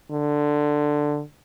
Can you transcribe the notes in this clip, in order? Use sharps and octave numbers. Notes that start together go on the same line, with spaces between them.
D3